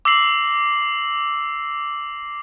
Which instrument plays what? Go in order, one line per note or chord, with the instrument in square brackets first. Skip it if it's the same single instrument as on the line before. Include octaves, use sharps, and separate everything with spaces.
[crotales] D6 E6 A#6 C7 F#7